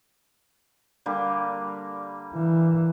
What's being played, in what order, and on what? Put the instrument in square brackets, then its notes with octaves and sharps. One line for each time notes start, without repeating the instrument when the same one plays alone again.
[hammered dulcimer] D3 G3 A#3
[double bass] E3